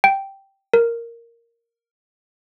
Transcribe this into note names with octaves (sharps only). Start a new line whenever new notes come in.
G5
A#4